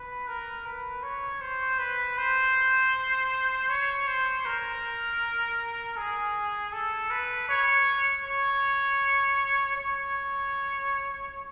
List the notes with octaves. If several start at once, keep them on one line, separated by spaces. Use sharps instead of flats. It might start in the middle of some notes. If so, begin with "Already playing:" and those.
Already playing: B4
A#4
B4
C#5
C5
B4
C5
C#5
C5
A#4
G#4
A4
B4
C#5
C#5
C#5